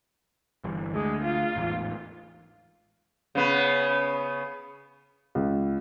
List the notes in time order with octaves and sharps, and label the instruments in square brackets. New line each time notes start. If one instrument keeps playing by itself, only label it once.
[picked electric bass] G1 G2 E3
[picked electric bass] D2 [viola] G#3
[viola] F4
[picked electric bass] A1 E2 G#2
[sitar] C#3 B3
[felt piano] C#2